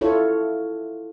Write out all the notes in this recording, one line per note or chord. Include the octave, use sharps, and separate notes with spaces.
E4 F4 A4 C#5